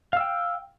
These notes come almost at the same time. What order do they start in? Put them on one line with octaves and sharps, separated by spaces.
F5 E6 G5